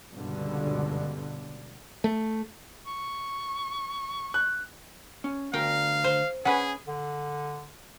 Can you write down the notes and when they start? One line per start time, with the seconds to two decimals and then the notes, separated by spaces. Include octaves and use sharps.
0.13 C#2 G2 B2 D3
2.04 A3
2.87 C#6
4.34 F#6
5.24 C#4
5.54 D2 A#4 F5 G5
6.04 C5
6.45 C#4 G#4 B4 F#5
6.87 D3